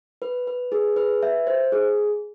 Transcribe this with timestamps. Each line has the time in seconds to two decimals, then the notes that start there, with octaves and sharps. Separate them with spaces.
0.22 B4
0.47 B4
0.72 G#4
0.96 B4
1.23 E5
1.47 C5
1.72 G#4